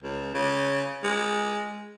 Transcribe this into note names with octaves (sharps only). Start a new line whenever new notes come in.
C#2
C#3
G#3